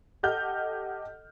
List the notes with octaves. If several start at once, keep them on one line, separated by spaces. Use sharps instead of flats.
G4 A4 D#5 F#5 F6 G6